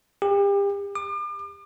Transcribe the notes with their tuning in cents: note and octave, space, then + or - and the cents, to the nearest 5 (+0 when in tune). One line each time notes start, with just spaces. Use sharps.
G4 +35
D6 +40